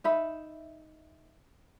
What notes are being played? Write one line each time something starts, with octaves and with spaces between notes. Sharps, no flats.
D#4 E5 B5